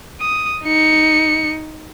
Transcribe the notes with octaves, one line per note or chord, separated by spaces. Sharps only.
D#6
D#4 C#7